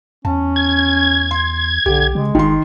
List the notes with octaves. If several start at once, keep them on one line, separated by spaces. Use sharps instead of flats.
E2 C#4 A5
G#6
C6
B1 D3 G4
C#3 G#3
G1 D#3 C6